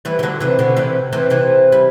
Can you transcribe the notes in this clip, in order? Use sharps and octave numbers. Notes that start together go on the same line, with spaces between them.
E3 G3
E3
D3 F#3
C3 E3
B2 D3
C3 E3
C3 E3
C3 E3
G3